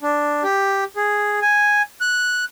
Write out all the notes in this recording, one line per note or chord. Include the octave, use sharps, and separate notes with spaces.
D4
G4
G#4
G#5
F#6